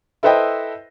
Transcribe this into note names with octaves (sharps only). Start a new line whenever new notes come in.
E4 A4 B4 C5 D#5 G5